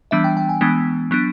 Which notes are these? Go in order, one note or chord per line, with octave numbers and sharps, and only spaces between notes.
E3 G3 B3 D4 E5
G5
G5
G#5
E3 G#3 B3 D4
F#3 B3 D4